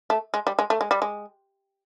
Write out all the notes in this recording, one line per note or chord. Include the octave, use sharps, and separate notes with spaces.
A3
G#3
G3
G#3
A3
G#3
G3
G#3